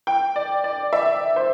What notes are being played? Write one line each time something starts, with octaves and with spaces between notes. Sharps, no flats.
G5
D5
D5
E5
C5